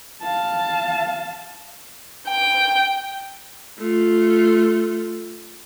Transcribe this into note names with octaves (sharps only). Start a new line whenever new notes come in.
F5 A5
G5
A3 F4